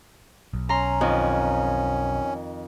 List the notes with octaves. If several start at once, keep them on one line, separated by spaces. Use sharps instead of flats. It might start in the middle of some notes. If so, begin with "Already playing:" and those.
B1
C#4 A#5 C6
F2 D#3